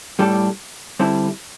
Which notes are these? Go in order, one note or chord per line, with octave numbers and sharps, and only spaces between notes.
A2 G3 D4 A4
D3 G3 C4 E4 A4